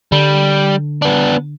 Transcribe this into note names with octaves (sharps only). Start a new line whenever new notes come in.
D3 G3
B3 D4